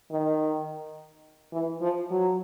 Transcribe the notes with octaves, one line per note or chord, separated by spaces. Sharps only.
D#3
E3
F3
F#3